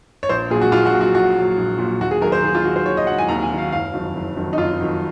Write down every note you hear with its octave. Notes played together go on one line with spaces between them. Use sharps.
C#5
A#1 C5
A#2 F#3 G#4
F#4
A#1 F4
F#4
A#2 F#3
F#4
A#1 F#4
A#2 F#3
A#1
A#2 F#3
D#2 F#4
G#4
D#3 F#3 A#4
C5
D#2 G#4
F4
D#3 F#3 F#4
C5
D#2 C#5
D#5
D#3 F#3 F#5
G#5
D#2 A#5
G#5
D#3 F#3
F5
F#1 F5
F2 D#3 F#3
F#1
F2 D#3 F#3
D#4
F#1 F4
F2 D#3 F#3